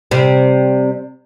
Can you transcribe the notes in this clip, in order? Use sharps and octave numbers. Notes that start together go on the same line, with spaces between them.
C3 G3